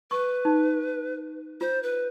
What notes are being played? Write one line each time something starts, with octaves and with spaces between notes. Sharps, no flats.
B4 C#6
D#4
F4 C5
B4